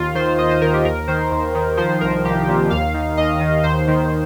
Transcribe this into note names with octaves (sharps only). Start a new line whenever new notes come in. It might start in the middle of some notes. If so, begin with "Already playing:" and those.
Already playing: D#2 F4
D#3 C5
D#2 D#5
C5
D#3 A#4
G4
D#2 A#4
D#3 C5
D#2
D#3
F3 C5
C2 A#4
C2 G4
A#2
D#2 F5
D#3
D#2 D#5
D#3
D#2 C5
D#3